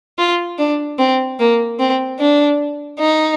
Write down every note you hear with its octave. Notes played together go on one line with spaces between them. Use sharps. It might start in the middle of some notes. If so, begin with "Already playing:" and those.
F4
D4
C4
A#3
C4
D4
D#4